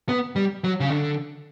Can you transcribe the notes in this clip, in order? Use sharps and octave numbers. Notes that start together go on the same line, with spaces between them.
B3
G3
F#3
C#3
D3